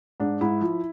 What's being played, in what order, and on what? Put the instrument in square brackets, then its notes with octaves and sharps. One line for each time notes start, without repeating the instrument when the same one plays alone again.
[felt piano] G#2 D4
G#2 E4
F3